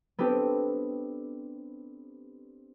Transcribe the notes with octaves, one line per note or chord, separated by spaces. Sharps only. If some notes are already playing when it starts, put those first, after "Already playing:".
B3 C4 D4 G4 A4